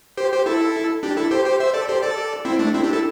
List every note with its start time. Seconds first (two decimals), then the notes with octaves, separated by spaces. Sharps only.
0.17 G4 C5
0.32 G4 C5
0.46 E4 A4
1.03 D4 G4
1.17 E4 A4
1.31 G4 C5
1.46 G4 C5
1.60 C5 E5
1.74 A4 D5
1.89 G4 C5
2.02 A4 D5
2.45 C4 E4
2.59 A3 D4
2.74 C4 E4
2.83 D4 G4
2.93 E4 A4